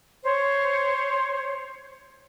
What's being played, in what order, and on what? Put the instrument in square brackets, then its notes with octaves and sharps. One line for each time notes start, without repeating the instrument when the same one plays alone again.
[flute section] C5 C#5